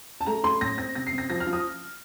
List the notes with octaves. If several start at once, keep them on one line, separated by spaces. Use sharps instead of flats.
A5
A3 A#5
A3 C6
A2 A#6
C4 A#6
C3 A#6
C7
C3
A#6
F3 A#6
F6
F3
D#6